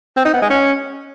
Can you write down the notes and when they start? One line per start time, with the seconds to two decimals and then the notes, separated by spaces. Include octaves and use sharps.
0.17 C4
0.25 D#4
0.33 B3
0.42 G#3
0.50 C#4